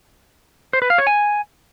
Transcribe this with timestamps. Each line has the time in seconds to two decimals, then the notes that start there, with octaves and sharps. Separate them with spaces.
0.73 C5
0.82 B4
0.90 F5
0.98 C#5
1.07 G#5